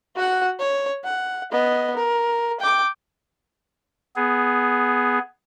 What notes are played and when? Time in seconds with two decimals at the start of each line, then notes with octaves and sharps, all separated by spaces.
0.16 F#4 F#5
0.59 C#5
1.05 F#5
1.52 B3 D#5
1.96 A#4
2.60 G5 D6
4.16 B3 G#4